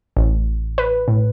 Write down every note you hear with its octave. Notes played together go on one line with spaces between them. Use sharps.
A1
B4
A2